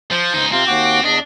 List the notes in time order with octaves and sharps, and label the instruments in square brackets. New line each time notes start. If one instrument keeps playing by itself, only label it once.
[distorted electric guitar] F3 [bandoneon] C5
[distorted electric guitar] C#2 D#4
[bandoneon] C3 F4 [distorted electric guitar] C4
[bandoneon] D#2 F#4 D6
[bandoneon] E2 D#5 [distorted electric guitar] D4